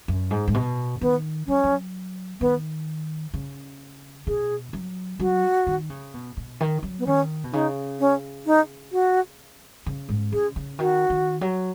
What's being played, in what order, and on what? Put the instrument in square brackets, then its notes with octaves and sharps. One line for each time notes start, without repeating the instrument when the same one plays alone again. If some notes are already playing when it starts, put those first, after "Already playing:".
[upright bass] F#2
G#2
G#2
B2
[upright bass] D#3 [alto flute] B3
[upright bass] F#3 [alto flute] C#4
[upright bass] F#3
[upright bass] D#3 [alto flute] B3
[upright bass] C#3
[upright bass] B2 [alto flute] G#4
[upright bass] F#3
[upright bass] F#3 [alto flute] F#4
[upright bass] D#3
C#3
B2
B2
D#3
F#3
[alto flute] B3
[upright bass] D#3 [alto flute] C#4
[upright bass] B2
[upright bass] C#3 [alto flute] D#4
[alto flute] C#4
D#4
F#4
[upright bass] C#3
G#2
[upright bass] C#3 [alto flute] G#4
[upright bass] C#3
[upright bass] D#3 [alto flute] F#4
[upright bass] D#3
F#3